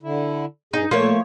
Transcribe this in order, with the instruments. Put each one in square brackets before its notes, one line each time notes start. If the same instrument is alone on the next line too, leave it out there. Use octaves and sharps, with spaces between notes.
[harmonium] D3 E4
[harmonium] G2 G#4 [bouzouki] D#4
[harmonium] A#2 [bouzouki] F3 C#5 [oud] A3 A#3